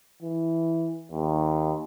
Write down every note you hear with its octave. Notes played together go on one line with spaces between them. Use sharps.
E3
D#2